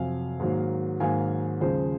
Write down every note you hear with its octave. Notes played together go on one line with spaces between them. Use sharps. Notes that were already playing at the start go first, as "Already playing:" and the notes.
Already playing: F2 C3 F#3 F5 G#5
G#2 D#3 F#3 A#3
G#2 D#3 F#3 A#3 F5 G#5
D#2 C#3 F3 G#3 G#4 C5